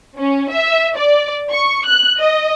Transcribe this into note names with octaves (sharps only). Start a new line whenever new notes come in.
C#4
E5
D5
C#6
F#6
D#5